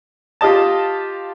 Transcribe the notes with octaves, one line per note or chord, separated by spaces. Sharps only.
F4 G4 D#5 A5